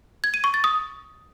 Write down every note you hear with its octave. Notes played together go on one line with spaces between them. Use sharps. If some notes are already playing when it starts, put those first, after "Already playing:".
G#6
D#7
C#6
A6
D#6